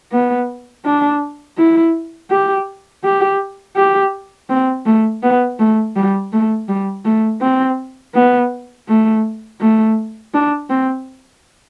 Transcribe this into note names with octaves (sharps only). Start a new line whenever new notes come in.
B3
D4
E4
G4
G4
G4
C4
A3
B3
A3
G3
A3
G3
A3
C4
B3
A3
A3
D4
C4